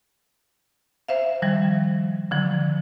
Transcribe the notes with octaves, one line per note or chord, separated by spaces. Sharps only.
C5 E5 F5
D#3 F3 G3
D3 F3 F#3